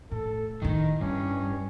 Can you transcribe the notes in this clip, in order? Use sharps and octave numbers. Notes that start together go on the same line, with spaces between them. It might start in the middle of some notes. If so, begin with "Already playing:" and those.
A2 A4
A2 D#3 D#4 E4
G2 C#4